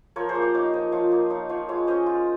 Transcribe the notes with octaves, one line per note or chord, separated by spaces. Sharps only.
F3 A#4 C#5
G#4 C5
A#3
G4
D#4 C#5 F5
F3 C5 D#5
F3 C#5 F5
A#3
D#4 C#5 F5
F3 C#5 F5
G#3 C#5 F5
C#4 C5 D#5
F4